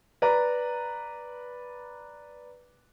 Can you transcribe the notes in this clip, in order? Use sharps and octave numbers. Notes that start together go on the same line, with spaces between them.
B4 D5 A#5